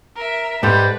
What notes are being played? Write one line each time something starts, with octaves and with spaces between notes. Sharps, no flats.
A#4 E5
G#2 G3 A4 B4 C5